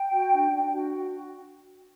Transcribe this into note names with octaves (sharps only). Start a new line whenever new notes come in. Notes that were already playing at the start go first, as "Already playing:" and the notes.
Already playing: G5
F#4
D4
D4
F#4